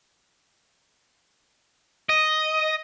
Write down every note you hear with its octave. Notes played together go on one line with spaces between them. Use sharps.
D#5